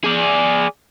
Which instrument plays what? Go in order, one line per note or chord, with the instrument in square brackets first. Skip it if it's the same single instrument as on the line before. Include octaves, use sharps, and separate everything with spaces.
[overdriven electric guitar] G#4 D5